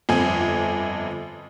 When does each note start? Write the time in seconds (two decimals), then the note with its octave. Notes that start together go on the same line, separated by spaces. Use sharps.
0.09 G1 F2 G#5